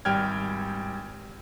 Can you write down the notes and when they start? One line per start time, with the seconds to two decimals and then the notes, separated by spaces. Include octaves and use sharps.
0.05 G#1 G3 G5 F6 G#6